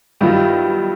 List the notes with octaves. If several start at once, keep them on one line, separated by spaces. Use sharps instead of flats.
G2 D#3 F#3 B3 E4 F4 G4